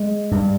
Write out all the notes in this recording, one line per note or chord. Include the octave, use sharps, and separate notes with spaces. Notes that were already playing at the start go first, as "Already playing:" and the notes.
Already playing: G#3
G2